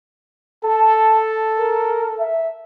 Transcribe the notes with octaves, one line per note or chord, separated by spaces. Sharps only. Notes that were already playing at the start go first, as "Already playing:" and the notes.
A4 A5
A#4
E5